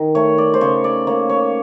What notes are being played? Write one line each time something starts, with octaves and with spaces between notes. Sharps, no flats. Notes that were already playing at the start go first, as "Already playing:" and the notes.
Already playing: D#3
A3 C#5
D5
C5
C#3 C#5
D5
A#3 C#5
C#5